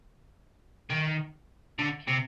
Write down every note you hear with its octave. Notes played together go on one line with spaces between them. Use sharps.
D#3
D3
C3